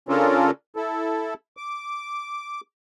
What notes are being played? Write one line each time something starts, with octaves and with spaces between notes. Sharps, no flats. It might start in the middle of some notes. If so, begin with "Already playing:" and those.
C#3 C#4 D4 F4 A4 A#4
E4 A4
D6